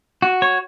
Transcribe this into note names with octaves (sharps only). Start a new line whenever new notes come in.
F#4
C#5